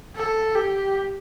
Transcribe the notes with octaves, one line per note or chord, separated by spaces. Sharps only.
A4
G4